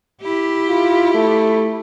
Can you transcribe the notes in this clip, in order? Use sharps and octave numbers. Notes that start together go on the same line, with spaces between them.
E4 G4
F4
A3